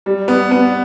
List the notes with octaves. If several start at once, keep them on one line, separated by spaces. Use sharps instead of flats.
G3
B3
B3